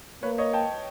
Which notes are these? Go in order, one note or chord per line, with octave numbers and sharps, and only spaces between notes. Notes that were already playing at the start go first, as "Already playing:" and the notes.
A#3 B4 C#5
C#5 D#5
G5 A5